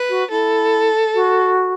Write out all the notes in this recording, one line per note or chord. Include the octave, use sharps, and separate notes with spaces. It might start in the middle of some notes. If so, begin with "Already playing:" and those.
Already playing: B4
F#4
E4 A4
F#4